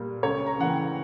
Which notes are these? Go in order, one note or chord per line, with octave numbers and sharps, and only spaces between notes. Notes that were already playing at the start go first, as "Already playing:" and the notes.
Already playing: A#2 G3 A#3
C#2 C#5
A#5
C#3 E3 A#3 F#5
G5